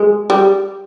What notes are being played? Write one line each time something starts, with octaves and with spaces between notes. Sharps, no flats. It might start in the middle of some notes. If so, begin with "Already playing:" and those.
Already playing: G#3
G3